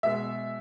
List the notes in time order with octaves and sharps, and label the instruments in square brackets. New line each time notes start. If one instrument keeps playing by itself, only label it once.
[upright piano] B2 G#3 B3 E5